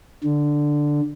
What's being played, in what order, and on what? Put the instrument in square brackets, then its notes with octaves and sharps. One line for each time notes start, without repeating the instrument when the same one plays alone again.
[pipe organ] D3